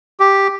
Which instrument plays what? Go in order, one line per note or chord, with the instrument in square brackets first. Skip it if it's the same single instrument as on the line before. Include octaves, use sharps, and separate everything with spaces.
[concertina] G4